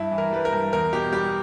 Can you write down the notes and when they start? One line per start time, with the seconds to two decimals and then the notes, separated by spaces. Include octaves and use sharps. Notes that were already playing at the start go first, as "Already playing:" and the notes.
Already playing: G2 E4
0.11 E3
0.18 A#4
0.32 G3 B4
0.45 A#4
0.53 G2
0.73 E2 A#4
0.93 B2 G4
1.13 G3 G4